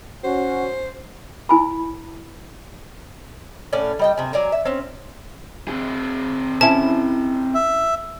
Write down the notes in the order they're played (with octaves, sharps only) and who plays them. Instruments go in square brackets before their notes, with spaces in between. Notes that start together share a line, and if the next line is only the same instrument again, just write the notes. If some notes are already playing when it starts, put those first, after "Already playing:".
[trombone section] C#4 F#4 [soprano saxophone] C5
[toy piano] E4 G#5 B5
[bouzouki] A2 C#4 D5
G3 D#5 G5
C3 G#4
F#3 D5 G#5 A#5
E5
C4 C#4
[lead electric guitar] C4 G#4
[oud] C#4 E4 [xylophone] A5
[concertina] E5